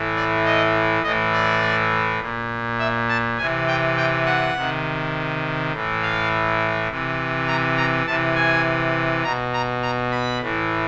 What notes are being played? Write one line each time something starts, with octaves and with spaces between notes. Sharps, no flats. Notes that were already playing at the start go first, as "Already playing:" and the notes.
Already playing: A2 E3
D5
D#5
A2 E3 D#5
D5
A#2
E5
A5
C3 E3 G#5
G5
G5
F#5
C3 D#3
A2 E3
F5
C3 E3
A#5
A#5
C3 E3 A5
G#5
B2 A#5
A#5
A#5
B5
A2 E3